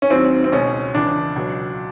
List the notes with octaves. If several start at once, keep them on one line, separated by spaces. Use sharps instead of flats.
C#4
D#2 D#3 F#3 C4
C4
C#2 B2 G#3 C#4
C#2 C#3 E3 D4
C#2 B2 F#3